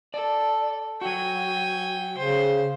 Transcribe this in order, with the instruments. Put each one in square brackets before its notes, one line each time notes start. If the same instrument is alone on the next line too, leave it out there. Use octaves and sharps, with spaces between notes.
[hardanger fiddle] A4 [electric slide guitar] D5
[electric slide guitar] F#3 F#4 [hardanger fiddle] G5 G#5
[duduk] C#3 [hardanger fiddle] C5